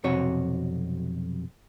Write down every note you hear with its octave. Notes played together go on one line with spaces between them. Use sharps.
B1 F2 C3 F#4 C#5